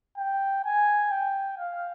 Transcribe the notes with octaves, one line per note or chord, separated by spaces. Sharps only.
G5
G#5
G5
F5